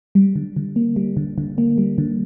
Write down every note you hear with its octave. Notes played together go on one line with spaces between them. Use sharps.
G3
D3
D3
A#3
G3
D3
D3
A#3
G3
D3